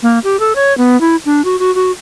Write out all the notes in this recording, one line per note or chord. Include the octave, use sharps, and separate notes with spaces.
A#3
G4
A4
C#5
B3
E4
D4
F#4
F#4
F#4